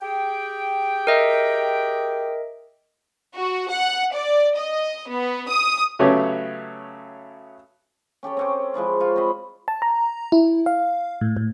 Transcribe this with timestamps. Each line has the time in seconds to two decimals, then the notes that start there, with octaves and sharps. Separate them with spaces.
0.02 G4 G#4 G5
1.07 A#4 D#5 E5
3.35 F#4
3.69 F#5
4.13 D5
4.55 D#5
5.08 B3
5.48 D#6
5.99 C#3 F#3 A3 B3 G4 C#5
8.23 C#4 G4 A4 C#5
8.37 C4 C#4 G4
8.74 F3 G#3 E4 D5
9.00 F4 C#5
9.16 C4 C5 D#5 B5
9.68 A5
9.82 A#5
10.32 E4
10.66 F5
11.21 A2
11.37 A2